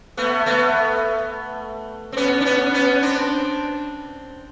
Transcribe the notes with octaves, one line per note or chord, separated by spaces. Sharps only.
A3 B3
A3 B3
C4
B3 C#4
D4
B3 C#4
B3 C#4
C4 D4